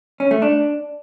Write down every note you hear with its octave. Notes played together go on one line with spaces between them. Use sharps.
C#4
A3
D4